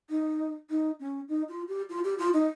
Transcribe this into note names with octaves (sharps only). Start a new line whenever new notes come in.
D#4
D#4
C#4
D#4
F4
G4
F4
G4
F4
D#4